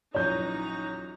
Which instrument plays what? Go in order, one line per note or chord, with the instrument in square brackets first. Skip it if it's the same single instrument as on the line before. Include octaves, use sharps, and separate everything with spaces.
[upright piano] A#1 F#2 E3 [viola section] D#4 F#4 A#5 [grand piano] C#5 G6